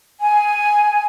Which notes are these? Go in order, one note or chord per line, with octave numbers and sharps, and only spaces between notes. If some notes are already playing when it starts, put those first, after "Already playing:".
G#5